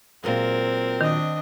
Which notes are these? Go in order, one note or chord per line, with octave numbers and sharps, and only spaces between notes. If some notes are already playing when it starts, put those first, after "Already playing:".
A#2 F#3 G#3 C4 A#4
D#3 D4 D#5